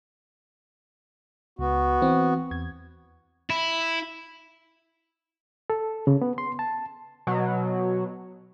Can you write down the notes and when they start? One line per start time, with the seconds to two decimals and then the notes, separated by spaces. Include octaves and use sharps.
1.59 C#2 B3 F#4
2.02 E3 C4
2.51 E2 G#6
3.50 E4
5.70 A4
6.07 C#3
6.22 B3
6.38 C6
6.59 A5
7.27 B2 F#3